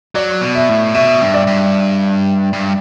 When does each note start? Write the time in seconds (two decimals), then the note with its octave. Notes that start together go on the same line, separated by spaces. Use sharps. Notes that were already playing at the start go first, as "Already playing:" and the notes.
0.15 F#3 D5
0.42 B2
0.55 E5
0.69 A2
0.94 B2 E5
1.21 G2
1.34 D5
1.47 G2
2.53 G2